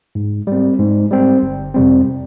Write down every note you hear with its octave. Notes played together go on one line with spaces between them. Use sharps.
G#2
G3 C4
G#2
G3 C4
G1
F2 C3 G3 C4